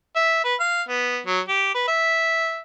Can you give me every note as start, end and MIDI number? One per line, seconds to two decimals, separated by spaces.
0.16 0.44 76
0.44 0.55 71
0.60 0.83 77
0.89 1.19 59
1.27 1.40 54
1.49 1.72 67
1.74 1.86 71
1.88 2.61 76